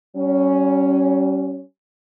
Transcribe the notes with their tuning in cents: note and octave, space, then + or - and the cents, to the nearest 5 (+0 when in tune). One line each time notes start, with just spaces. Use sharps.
G3 -45 C#4 +0